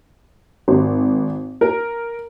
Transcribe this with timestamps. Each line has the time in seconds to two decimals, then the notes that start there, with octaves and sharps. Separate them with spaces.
0.68 G#1
1.61 A#4